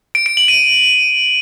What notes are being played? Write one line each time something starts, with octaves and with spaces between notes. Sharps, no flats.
D7
D7
F#7
D#7